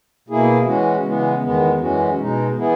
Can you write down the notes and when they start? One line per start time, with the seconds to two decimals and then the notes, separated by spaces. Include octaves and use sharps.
0.28 B2 A#3 E4 G#4
0.65 E3 G#3 C#4 F#4
1.04 C#3 E3 G#3 B3
1.41 E2 D#3 G#3 B3
1.80 F#2 E3 G#3 C#4 F#4
2.18 B2 G#3 D#4
2.56 E3 B3 E4 G#4